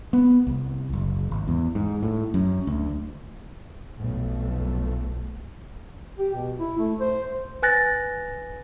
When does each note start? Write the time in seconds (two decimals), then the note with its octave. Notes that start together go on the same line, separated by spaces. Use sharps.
0.13 B3
0.47 C2
0.93 F#1
1.31 G#1
1.48 E2
1.75 G#2
2.03 A2
2.34 F#2
2.67 D2
3.99 B1 F2 A3
6.19 G4
6.34 B2
6.60 E4
6.78 A3
7.00 C5
7.62 B4 G#5 F#6 A6 A#6